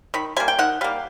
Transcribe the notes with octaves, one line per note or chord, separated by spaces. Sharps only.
D#3 B5
G3 A#3 G#5
G5
D#3 F#5
G3 A#3 F5